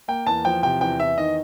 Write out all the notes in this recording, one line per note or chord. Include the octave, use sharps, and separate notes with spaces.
A#3 G5
E2 A5
F3 G5
C3 G5
E2 G5
E2 E5
D#3 D#5